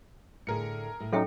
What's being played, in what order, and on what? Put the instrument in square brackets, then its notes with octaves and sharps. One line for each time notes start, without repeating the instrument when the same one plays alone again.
[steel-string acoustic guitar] A2 D3 [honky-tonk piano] G#4 A#4 C#7
[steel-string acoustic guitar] A2
[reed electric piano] F#3 C#4 D#4 [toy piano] A4 E5 G5